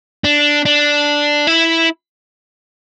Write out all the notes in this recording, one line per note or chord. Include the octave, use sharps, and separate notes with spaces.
D4
D4
E4